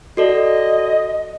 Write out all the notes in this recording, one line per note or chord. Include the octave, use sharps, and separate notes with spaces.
F#4 A4 D5 D#5